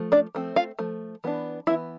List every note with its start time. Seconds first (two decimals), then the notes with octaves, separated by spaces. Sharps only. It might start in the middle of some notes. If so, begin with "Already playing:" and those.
Already playing: F3 A3
0.12 D4 D5
0.35 F3 A3 C4
0.56 F4 F5
0.79 F3 A3
1.24 E3 B3 D4
1.67 E3 B3 D4 E4 E5